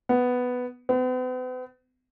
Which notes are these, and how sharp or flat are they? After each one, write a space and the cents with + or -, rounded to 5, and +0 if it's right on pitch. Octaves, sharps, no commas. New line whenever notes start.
B3 +5
B3 +45